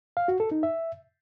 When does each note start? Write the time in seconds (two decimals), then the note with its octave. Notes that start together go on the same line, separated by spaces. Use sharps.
0.17 F5
0.28 F#4
0.40 A4
0.51 D#4
0.63 E5